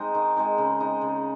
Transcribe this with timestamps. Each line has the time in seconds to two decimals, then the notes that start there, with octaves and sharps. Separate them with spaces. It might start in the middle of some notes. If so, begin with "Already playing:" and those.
Already playing: G#3 C4 D#4
0.15 D#3
0.36 G#3 C4 D#4
0.58 C#3
0.80 G#3 C4 D#4
1.01 C#3